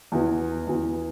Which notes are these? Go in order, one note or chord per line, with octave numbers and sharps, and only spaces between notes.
E2 E3
E2 E3